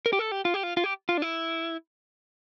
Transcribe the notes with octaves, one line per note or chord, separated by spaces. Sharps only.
A#4
G4
A4
G4
F4
G4
F4
F4
G4
F4
D4
E4